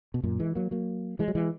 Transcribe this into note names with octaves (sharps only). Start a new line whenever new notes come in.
B2
F#2 A#2
E3 G#3
F#3 A#3
F#3 A#3
E3 G#3
F#3
E3 G#3